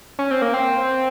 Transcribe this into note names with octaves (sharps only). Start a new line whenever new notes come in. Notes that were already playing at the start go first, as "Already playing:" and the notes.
C#4
C4
A#3
C4